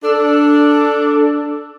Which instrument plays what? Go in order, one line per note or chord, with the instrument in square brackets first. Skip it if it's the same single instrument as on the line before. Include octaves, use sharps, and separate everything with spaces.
[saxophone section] D4 [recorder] A4